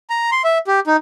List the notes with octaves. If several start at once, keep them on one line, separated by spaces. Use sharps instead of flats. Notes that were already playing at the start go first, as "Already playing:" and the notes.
A#5
C6
E5
G4
D#4